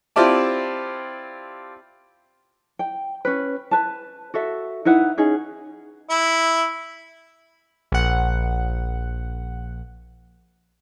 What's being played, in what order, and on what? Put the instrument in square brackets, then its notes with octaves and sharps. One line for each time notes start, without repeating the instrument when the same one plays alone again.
[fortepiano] C4 E4 F4 G4 D5 A5
[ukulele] G5
C#4 B4
B4 A5
F#4 A4 E5
D#4 E4 B4 F#5
C#4 D#4 G#4
[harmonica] E4
[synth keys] A#1 F#5